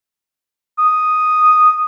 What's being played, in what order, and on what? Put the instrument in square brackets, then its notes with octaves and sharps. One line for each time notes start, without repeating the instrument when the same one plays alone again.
[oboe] D#6